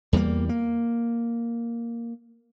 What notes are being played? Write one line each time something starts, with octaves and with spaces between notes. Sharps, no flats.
E2 G3 A3 A#3
A#3